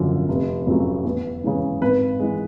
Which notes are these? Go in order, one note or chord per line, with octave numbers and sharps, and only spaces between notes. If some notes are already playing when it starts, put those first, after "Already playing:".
Already playing: G#1 F#2 D3 F3
F1
F2 C#3 F#3 A3
E2
C#3 E3 G#3
G#1 B4
E3 G#3